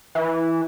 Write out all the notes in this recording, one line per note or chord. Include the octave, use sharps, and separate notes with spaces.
E3